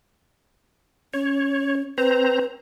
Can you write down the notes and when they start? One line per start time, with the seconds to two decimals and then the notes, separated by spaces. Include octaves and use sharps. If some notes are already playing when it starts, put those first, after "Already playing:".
1.14 C#4 C#5
1.98 C4 B4 C5 A#5